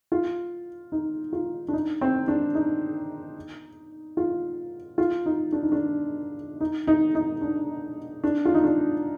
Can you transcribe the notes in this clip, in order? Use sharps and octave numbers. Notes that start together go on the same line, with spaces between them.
F4
D#4
F4
D4
D#4
C4
D4
D#4
F4
F4
D#4
D4
D#4
D4
D#4
D#4
D#4
D4
D4
F4
D#4
D4